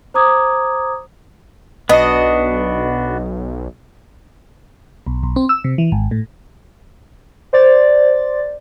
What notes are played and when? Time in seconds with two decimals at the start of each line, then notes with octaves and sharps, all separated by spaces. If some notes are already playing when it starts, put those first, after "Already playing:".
0.14 C5 A#5 D6 D#6 G#6
1.89 B1 B3 D4 F#4 D#5
5.07 B1
5.23 B1
5.36 C4
5.49 E6
5.64 C3
5.78 E3
5.92 G#1
6.11 A2
7.53 C5 D5 A6